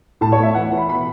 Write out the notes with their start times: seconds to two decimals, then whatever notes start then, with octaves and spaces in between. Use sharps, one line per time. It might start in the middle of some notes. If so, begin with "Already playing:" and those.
0.21 A2 A5
0.32 C#5
0.39 A3 E5
0.55 E3 F#5
0.72 E3
0.77 B5
0.89 B2 B5